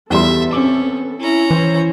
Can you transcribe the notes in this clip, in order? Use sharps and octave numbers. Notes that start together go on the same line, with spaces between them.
E2 G3 B3 A4 E5 C6
C4 C#4 D6
C#4 E4 A#5
E3 E4 C5 C#5